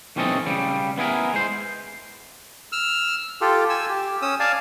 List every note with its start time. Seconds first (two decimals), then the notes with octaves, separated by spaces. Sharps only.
0.16 B1 E3 C4 C#4 A4 D#5
0.46 C#3 G3
0.98 B3 E4 G#4 A#4
1.34 G#3 C5
2.72 E6 F6
3.41 F4 G4 A4
3.70 G#5 E6
3.89 G4
4.22 C#4 D#6 E6
4.40 D5 F5 G#5 A5